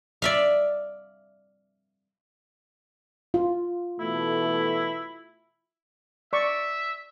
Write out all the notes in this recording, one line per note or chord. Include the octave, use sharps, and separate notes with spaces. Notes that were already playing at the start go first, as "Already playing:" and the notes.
D5 E5 F5
F4
B2 E3 A3 E4
D5 E5 C#6